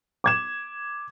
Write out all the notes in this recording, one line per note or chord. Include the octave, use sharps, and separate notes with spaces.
D6 G#6 E7